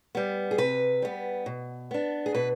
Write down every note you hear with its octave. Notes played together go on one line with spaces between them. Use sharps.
G3 B3
G#4
C3 B4
G3 B3
B2
B3 D4
G#4
B2 B4